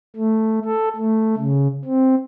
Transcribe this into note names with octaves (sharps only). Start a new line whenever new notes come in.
A3
A4
A3
C#3
C4